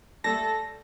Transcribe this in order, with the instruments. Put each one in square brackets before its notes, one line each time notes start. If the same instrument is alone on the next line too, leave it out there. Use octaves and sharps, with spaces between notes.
[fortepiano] G3 A3 E5 [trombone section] A4 [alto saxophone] A5 [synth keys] A#6